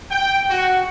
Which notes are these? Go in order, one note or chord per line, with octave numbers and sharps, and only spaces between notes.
G5
F#4